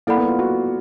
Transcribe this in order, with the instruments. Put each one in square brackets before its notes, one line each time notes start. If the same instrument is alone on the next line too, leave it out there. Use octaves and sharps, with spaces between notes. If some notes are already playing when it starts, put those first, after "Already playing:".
[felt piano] A#3 [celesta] E4 A4 D5 F#5 B5
[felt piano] B3
F4
F#4